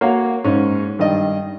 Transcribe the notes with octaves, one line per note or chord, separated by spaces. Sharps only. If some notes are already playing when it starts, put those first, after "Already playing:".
A#3 F#4 C#5 F5
G#2 C#4
G2 D#3 D5 D#5